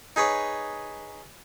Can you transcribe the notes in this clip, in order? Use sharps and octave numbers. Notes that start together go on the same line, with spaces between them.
D#4 G#4 B4 C#5